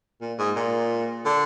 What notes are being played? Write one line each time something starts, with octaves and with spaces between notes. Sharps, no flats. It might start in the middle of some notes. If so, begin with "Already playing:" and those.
A#2
G#2
A#2
D3